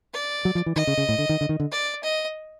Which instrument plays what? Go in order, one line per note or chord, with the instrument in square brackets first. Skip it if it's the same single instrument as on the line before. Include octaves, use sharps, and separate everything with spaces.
[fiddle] D5
[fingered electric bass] F#3
F3
E3
[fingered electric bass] D#3 [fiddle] D#5
[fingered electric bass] C#3
C#3
A2
D3
D#3
D3
D#3
D3
[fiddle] D5
D#5